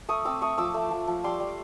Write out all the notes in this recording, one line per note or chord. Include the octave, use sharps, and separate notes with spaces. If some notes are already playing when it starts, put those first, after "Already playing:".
A3 C#6 D#6
C4 D6 E6
A3 C#6 D#6
F3 D6 E6
A3
F3
F3
G3 C6 D6
G3